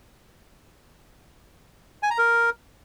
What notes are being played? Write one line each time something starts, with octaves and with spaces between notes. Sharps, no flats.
G#5
A#5
A#4